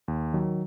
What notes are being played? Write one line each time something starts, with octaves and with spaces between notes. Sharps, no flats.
D#2
D#3 F#3